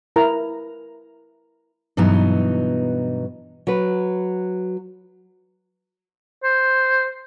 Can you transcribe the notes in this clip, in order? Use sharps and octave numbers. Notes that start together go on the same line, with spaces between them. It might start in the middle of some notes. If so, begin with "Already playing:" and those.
E4 A#4 A#5
G2 B2 E3 F#3 B3 D#4
F#3 B4
C5